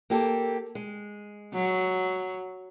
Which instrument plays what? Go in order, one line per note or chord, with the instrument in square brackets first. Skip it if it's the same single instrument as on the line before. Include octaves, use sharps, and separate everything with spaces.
[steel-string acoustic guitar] A#3 G4 A4
G#3
[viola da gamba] F#3